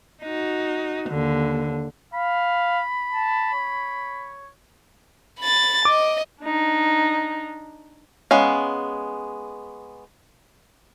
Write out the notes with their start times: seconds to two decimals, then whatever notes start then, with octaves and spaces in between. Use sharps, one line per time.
0.23 D#4 F#4
1.10 D#2 D3
2.14 F5 B5
3.11 A5
3.54 C#5
5.40 B5 A6
5.85 D#5 D6
6.43 D4 D#4
8.31 G#3 B3 C#4 F5